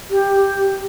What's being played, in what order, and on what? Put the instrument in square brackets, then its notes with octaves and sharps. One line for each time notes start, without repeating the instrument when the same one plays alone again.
[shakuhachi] G4